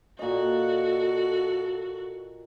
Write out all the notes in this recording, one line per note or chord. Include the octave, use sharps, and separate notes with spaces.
A#2 F#4 A4 D#5